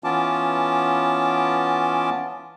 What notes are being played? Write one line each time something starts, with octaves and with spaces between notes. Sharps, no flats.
E3 B3 C#4 F4 A5 D6